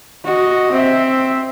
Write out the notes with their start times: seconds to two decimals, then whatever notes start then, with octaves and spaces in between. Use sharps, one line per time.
0.24 F#4 D#5
0.72 C4 E5